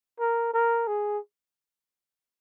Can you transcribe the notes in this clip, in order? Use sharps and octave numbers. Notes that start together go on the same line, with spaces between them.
A#4
A#4
G#4